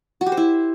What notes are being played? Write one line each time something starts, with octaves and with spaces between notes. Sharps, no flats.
F#4
G4
C5
E4